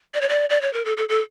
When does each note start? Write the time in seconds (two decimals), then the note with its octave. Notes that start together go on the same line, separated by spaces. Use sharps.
0.14 D5
0.21 C#5
0.29 D5
0.50 D5
0.62 C#5
0.73 A#4
0.85 A4
0.97 A4
1.09 A4